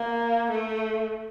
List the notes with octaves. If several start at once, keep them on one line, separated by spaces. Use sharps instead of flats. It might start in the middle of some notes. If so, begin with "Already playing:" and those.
Already playing: A#3
A3